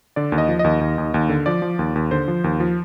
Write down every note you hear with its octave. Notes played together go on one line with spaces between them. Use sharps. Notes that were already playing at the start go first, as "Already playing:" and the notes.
D3 D5
D#2
D#5
F3
D#5
D#2
D#2
D#2
D#2
D3
F3 D5
F3
D#2
D#2
D3 C5
F3
D#2
F3